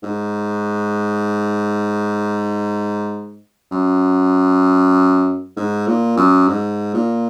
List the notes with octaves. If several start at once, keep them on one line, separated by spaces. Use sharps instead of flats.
G#2
F#2
G#2
A#2
F#2
G#2
A#2